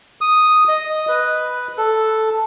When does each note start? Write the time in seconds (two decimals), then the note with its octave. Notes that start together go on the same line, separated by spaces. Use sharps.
0.21 D#6
0.69 D#5
1.09 B4
1.78 A4